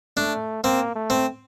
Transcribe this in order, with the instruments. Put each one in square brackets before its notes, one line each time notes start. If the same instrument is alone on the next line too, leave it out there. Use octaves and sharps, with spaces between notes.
[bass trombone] A3 [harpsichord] D4
[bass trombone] A#3 [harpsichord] C4
[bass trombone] A3
[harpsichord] C4